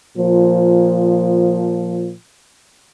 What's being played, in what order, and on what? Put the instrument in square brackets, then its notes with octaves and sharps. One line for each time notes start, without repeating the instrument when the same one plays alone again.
[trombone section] A#2 F3